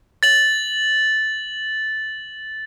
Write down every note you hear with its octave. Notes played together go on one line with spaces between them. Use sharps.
A6 F#7